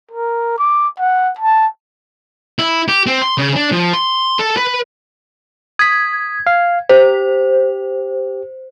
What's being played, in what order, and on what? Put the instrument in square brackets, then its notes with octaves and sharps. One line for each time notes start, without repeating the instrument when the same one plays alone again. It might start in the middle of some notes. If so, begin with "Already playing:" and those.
[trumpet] A#4
D6
F#5
A5
[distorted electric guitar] E4
G4
C4
C6
C#3
D4
F3
C6
A4
B4
[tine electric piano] D#6 B6 [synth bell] G#6
[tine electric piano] F5
[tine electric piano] G4 [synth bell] C5